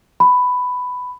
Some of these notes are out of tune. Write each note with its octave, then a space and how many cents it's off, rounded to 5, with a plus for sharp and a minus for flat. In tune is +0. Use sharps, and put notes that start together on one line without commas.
B5 +10